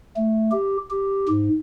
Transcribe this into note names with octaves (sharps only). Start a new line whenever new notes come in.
A3
G4
G4
G#2